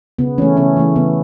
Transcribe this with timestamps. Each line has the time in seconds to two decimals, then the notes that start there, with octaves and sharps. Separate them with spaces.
0.19 C#3 B3
0.38 E3 A3 C#4
0.57 C#3 C#4
0.77 E3 A3
0.96 C#3 B3